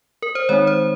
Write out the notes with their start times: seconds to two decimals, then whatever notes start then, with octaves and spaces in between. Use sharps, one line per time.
0.22 A#4
0.35 C5
0.49 D#3 G#3 C4 D#4 C#5
0.67 C5